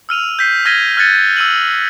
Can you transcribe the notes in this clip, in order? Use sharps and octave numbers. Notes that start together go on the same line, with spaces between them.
E6 F6 D#7 F7
G6 B6 C7
F6 G#6 A#6 B6 D#7 G7
F6 F#6 G#6 A6 C#7 D#7
D#7
E6 D#7 F#7